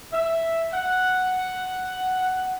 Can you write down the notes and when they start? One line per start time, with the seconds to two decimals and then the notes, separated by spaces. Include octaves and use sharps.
0.12 E5
0.73 F#5